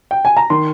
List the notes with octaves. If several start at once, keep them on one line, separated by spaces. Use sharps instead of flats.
G5
G#5
A#5
D#3 C6